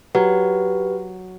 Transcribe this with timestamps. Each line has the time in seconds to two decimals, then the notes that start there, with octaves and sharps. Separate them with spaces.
0.15 F#3 G4 B4